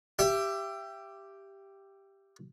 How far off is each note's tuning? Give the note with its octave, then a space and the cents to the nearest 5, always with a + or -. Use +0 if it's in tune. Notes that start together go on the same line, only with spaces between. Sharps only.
G4 +0 E5 +30